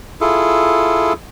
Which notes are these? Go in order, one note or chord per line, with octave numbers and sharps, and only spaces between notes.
E4 F4 G#4 A4